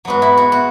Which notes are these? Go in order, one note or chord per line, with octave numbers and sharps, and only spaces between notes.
G#2 F#3 B3 F#4
E4
F#4
F#4